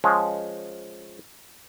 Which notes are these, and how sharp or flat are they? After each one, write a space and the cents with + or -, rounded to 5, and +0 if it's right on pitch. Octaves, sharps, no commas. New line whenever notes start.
F3 +0 G#3 +0 C#4 +0